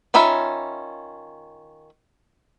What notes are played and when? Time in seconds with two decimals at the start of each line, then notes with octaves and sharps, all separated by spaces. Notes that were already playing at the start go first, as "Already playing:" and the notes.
0.14 D#3 C#4 F4 E5 B5